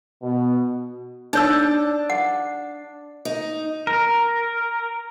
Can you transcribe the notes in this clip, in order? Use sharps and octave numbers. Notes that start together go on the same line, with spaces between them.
B2
D4 D#4 C#5 E6
F#5
D#4
A#4